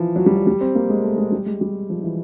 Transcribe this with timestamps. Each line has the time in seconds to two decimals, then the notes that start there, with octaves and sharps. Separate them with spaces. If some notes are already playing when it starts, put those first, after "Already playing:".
Already playing: E3 F3
0.16 F#3
0.26 G3
0.37 F#3
0.47 G3
0.61 C4
0.75 A#3
0.90 G#3
1.04 A3
1.18 G#3
1.32 G3
1.46 G#3
1.61 G3
1.90 F3
2.03 E3